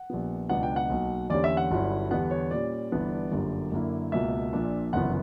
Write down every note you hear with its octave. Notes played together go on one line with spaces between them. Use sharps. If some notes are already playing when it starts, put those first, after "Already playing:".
Already playing: F#5
A#1 A#2 G3 B3
C#2 B2 F#3 B3 D4 F#5
G5
F#5
B1 B2 A#3
E2 D3 G3 A#3 C#4 D5
E5
F#5
G1 G2 F#3 C#4 E4
E2 D3 G3 B3 D4 F#5
C#5
A#2 G3 C#4 D5
G1 G2 E3 B3 D4
G1 F#2 D3 G3 A#3
F#2 D3 A#3 E4
C#2 B2 A#3 E5
A#1 A#2 A#3 D4
G1 F#2 C#3 E3 B3 F#5